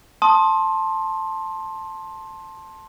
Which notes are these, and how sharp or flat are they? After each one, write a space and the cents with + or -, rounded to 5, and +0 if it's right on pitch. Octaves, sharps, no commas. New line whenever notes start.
A5 +0 C6 +20 D#6 +0